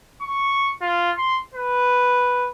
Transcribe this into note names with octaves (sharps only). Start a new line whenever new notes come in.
C#6
F4
C6
B4